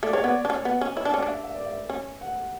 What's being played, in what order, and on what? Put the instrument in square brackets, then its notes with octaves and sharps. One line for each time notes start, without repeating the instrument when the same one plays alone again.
[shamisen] A3 [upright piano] D5
[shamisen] G#3 [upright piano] C#5
[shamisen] B3 [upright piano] D5
[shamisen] D4
C#4
B3
C#4
[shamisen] E4 [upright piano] C#5
[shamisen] D4
[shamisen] C#4 [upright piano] D5
[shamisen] D4
[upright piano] E5
E5
D5
E5
[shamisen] C#4
[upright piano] F#5